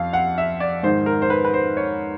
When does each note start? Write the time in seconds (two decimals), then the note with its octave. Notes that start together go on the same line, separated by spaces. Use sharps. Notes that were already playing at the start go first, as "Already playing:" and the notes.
Already playing: F2 F5
0.13 F#5
0.38 E5
0.60 D5
0.83 G#2 D#3 C5
1.06 A#4
1.22 C5
1.30 B4
1.44 B4
1.54 C5
1.77 C#5